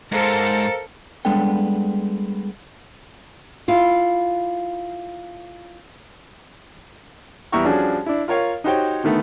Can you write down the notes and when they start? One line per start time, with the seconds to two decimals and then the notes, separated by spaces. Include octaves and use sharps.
0.12 G#2 A4 A#4 C5 F5 A#5
1.25 G3 G#3 B3 D4 A4 G5
3.68 E4 F4
7.52 E2 G3 E4 A#5 C#6 E6
7.65 F3 G3 C#4 D4 F#4 G#4
8.06 D4 E4
8.28 F4 A#4 C#5 F5
8.64 D#4 F#4 G4 C5 C#5 G5
9.04 D3 D#3 A3 B3